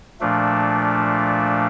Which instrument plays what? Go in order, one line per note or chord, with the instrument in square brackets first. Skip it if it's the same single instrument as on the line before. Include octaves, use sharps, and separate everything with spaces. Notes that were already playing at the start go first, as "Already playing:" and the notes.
[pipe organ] A#2 F3 A3 D4